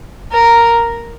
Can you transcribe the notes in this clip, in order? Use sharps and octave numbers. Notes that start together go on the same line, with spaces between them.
A#4